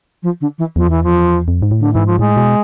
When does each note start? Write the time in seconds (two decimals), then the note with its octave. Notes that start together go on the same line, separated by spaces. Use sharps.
0.23 F3
0.41 D3
0.58 E3
0.76 E2 F3
0.90 E3
1.03 F3
1.48 F2
1.62 G#2
1.71 A2
1.80 D3
1.93 G#2 E3
2.06 F3
2.19 A2 G#3
2.37 B2